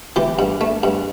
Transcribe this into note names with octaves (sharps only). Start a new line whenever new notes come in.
E3 G4
G2
A3
G2